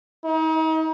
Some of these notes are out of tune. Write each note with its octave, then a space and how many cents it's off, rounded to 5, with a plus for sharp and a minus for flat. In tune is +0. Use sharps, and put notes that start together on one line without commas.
D#4 +40